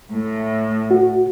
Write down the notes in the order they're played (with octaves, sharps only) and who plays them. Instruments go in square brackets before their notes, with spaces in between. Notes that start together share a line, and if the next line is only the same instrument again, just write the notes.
[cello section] A2
[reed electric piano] F#4